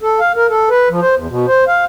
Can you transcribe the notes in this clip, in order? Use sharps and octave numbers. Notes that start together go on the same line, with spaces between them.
A4
F5
A#4
A4
B4
F3
C5
E2
B2
C5
F5